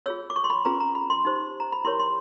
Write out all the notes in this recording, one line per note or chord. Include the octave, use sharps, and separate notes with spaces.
F4 G#4 C#5 E6
D6
C#6
C6
B5
C#4 F4 G#4 B4 A#5
A#5
B5
C6
D#4 G4 C5
A#5
B5
E4 G4 A#4 C#5 C6
C6